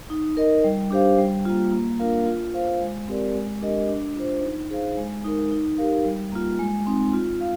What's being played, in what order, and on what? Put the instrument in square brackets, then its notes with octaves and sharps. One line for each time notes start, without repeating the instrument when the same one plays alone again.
[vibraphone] D#4
A#4 D#5
G3
D4 G4 C5 F5
G3
A#3 F4
A#3
D4 F4 A#4 F5
F4
C5 F5
G#3
C4 G4 A#4 D5
G#3
D4 G4 A#4 D#5
D4
F4 C5
D#4
G#4 C5 F5
G#3
D#4 A#4
D#4
G4 A#4 F5
G3
A#3 F4
G#3
C4 D#4
F4
F5